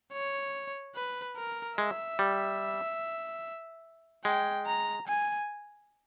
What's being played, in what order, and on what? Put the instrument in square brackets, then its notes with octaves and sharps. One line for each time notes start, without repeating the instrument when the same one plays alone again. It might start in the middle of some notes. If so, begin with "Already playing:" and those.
[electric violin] C#5
B4
A#4
[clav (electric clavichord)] G#3 [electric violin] E5
[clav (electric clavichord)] G3
[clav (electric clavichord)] G#3 [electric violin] G5
[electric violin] A#5
G#5